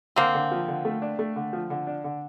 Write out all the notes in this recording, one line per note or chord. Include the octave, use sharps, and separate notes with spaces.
D3 A#3 C4
D3
F3
D3
A3
D4
A3
D3
F3
D3
D4
D3